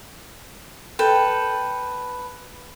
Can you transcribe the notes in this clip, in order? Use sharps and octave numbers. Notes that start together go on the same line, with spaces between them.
A4 B4 G5